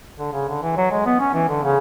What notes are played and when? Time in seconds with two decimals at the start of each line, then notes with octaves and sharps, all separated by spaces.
0.18 D3
0.33 C#3
0.48 D3
0.62 E3
0.77 F#3
0.91 G#3
1.05 B3
1.20 C#4
1.34 E3
1.49 D3
1.63 C#3